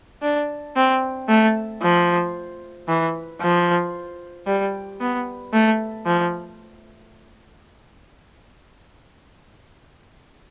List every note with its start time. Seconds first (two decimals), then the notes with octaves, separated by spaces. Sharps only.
0.22 D4
0.76 C4
1.29 A3
1.82 F3
2.88 E3
3.41 F3
4.47 G3
5.00 B3
5.53 A3
6.06 F3